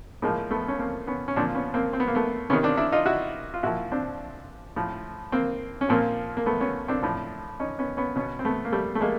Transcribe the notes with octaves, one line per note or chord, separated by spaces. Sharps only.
A2 F3 G#3 A#3
A3 B3
C#4
A#3 C4
B3 C#4
C#4
A#2 F3 C4 D4
B3 C#4
A#3 C4
C4
B3
A#3
A3 B3
C3 D#3 B3 C#4
C4 D4
D4 E4
D#4 F4
E4 F#4
F4
A#2 F3 E4 F#4
C4 D4
A2 F3
A#3 C4
C#4
A#2 F3 A#3 C4
A#3
A3 B3
B3 C#4
C4 D4
A2 F3
C#4 D#4
B3 C#4
B3 C#4
B2 B3 C#4
C4
A3 B3
A#3
G3 A3
A3
G#3 A#3